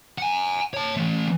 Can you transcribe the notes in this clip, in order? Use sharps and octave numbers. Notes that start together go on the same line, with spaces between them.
F#5 G#5
C#5 A5
E3 A3